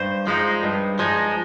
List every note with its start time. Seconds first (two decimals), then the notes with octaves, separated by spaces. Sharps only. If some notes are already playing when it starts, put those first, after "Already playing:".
Already playing: G2 C5
0.27 F3 G#3 D#4
0.63 G2
0.99 F3 G#3 D#4